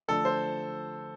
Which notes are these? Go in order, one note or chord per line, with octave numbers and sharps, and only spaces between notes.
D3 F3 A3 A4
C5